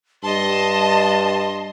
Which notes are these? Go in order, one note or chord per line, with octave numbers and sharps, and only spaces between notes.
G2 D#5 A5 C6